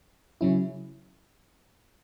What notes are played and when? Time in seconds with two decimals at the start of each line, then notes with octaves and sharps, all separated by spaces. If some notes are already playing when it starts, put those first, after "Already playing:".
0.41 C#3 F#3 C#4 E4